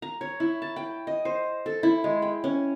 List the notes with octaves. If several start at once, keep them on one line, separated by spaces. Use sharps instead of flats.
A#5
C#5
E4
A5
G5
D#5
C5
A4
E4
G#3
G5
C#4